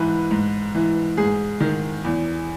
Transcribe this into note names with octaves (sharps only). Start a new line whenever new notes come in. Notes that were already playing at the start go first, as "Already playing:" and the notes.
Already playing: G#2 E3 B4
G#2
E3
G#2 G#4
D#3
E2